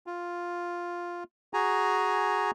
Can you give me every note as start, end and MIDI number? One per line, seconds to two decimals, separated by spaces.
0.07 1.24 65
1.54 2.51 66
1.54 2.51 68
1.54 2.51 80
1.54 2.51 82